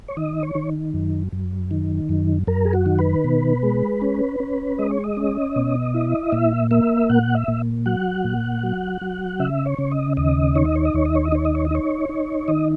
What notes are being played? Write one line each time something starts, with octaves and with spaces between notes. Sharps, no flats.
C#5
D#3 D#5
C#5
D#3
F#2
F#2
D#3
F#2
F#2 A#4
G#4
F#4
D#3
B4
B2
G#3
C#4
C#4
G#3 D#5
C#5
D#5
C#4
B2
E4
A#2 E5
A#3 E5
A#2 F#5
E5
A#2
F#3 F#5
A#2
F#3
F#3
C#3 E5
C#5
C#3
D#5
D#2 D#5
D#4 C#5
D#5
C#5
D#5
D#2 C#5
D#5
C#5
D#5
D#4 C#5
D#5
C#5
D#5
D#4 C#5
D#4
D#3 D#5